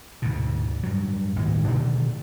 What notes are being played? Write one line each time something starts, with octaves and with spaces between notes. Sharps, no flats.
D2 G#2 B2
G2 F#3
G#1 D#2 A2
B2 D3 D#3 A3